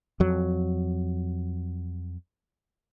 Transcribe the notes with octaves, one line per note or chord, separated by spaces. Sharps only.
F2 F#3